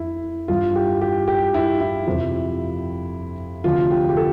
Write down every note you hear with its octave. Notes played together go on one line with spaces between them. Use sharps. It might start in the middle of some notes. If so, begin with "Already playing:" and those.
Already playing: F2 E4
G2 E3 F4
G4
G4
G4
E4
E4
F2 C3 F3
D2 C3 F3 F4
G4
G4
A4